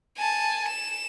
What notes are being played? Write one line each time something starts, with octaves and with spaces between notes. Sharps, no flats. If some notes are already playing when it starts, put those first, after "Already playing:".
G#5 A5
E7